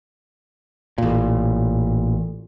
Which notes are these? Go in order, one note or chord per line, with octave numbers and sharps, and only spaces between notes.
A1 A#2